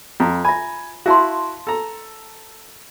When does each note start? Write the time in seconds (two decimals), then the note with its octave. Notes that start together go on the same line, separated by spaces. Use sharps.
0.20 F2 F4 A#5
0.45 E5 G#5 B5
1.06 E4 F#4 F5 A5 C6
1.67 A4 A#5